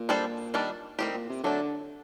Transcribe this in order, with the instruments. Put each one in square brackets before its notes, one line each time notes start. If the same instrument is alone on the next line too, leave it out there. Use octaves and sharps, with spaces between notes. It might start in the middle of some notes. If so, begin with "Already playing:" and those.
Already playing: [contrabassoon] A#2
[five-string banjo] G3 D4 A4 C5
D#3 G3 D4
[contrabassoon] A2 [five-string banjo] D#3 G3 C4 G4
[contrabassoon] A#2
C3
[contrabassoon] D3 [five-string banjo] F#3 A3 D4